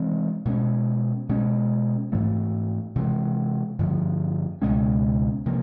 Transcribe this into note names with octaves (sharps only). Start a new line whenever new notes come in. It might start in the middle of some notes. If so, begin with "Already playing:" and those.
Already playing: C3 E3 G#3 C4
B2 G#3 C#4
B2 G#3 C#4
G#2 E3 A3
C3 E3 G#3
G2 D3 F3
C#2 B2 G#3 C#4
C3 F3 A#3